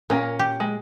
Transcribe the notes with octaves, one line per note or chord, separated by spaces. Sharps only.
A#2 A#3 C#4 A#4
G4
G#3